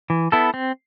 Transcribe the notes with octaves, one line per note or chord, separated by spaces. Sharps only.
E3
B3 E4 A4
C4